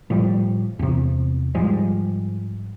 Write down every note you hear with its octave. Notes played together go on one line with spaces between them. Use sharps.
A2 F3 G3
E2 C3
G#2 F3 G3 G#3